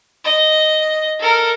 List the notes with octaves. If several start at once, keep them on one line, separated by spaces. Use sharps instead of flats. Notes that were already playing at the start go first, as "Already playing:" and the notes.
D#5
A4 A#4